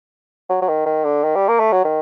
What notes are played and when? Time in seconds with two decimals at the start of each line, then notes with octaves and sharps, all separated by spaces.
0.49 F#3
0.62 F#3
0.69 D#3
0.86 D#3
1.05 D3
1.24 D#3
1.36 G3
1.48 A#3
1.60 A3
1.72 F#3
1.85 D#3